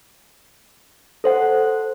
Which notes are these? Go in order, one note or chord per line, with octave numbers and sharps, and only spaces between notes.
A4 C5 F#5